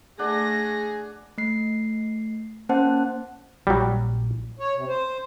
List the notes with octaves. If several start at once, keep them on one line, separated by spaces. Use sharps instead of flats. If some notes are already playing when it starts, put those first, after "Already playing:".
A3 D4 G#4 F#5 A#6
A3 C7
A#3 C#4 C5 F#5 A5
A#1 F#3 G3
C#5
C3
C5